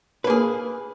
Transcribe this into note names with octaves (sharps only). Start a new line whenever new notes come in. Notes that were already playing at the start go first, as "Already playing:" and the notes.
A#3 G#4 B4